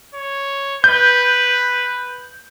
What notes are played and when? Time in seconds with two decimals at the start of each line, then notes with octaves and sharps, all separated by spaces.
0.15 C#5
0.84 B4 G6